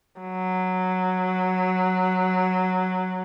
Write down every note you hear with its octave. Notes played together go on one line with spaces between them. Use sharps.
F#3